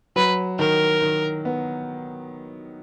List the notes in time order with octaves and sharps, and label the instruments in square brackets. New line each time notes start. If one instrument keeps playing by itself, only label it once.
[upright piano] F#3 [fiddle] B4
[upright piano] D#3 [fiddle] A#4
[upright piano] D#3
B3